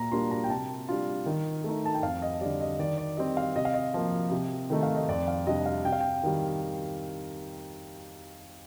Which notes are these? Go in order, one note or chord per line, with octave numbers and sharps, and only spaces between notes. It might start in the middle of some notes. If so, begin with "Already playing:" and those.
Already playing: A#2 A#5
G3 A#3 D4 F4 C6
A#5
G5
C3 A5
G3 D4 F4
D#3
A3 D#4
A5
G5
F2 F5
D#5
D3 G3 D5
D#5
D#3 D5
D5
G3 C4 D#5
F5
C3 D#5
F5
D#5
F3 A#3 F4
C3
D#3 A3 D#4
F5
D#5
F2 D5
F5
C3 G3 D4 D#5
F5
C3 G5
F5
G5
D#3 G3